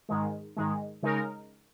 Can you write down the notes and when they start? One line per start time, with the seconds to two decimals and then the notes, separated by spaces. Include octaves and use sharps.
0.09 G#2 D#3 G#3
0.57 G#2 D#3 G#3
1.03 C#3 G#3 D#4 A#4